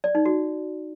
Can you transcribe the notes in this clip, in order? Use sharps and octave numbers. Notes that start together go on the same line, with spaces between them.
D5
D#4
F#4